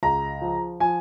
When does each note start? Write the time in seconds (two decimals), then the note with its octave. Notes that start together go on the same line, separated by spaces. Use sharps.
0.03 C#2 A#5
0.41 F3
0.80 F3 G#5